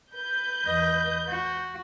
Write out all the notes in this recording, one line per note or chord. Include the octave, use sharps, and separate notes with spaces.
B4 G6
E2 D#5
F#4